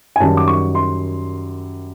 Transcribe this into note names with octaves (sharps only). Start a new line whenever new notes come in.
G#5
F#2 D#3 G3 A5
D6
C#6
C6